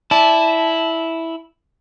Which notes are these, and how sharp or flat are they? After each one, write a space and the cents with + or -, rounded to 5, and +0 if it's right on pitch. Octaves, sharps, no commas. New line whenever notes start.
E4 -5 D5 +0 A5 -20